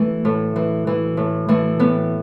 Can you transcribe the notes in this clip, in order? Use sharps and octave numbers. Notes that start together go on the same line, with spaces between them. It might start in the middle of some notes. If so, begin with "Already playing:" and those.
Already playing: E3 A3
A2
E3
E3
A2
E3 A3
A2 B3